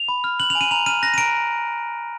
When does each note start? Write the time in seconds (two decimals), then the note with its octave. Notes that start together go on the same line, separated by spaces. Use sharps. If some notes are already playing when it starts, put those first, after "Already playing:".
Already playing: F7
0.09 B5
0.24 F6
0.39 F#6 F#7
0.50 F7
0.55 G#5
0.61 D#7
0.71 A#5 F7
0.86 F6 D#7
1.02 F#6 A#6
1.14 D#7
1.18 A#5 D7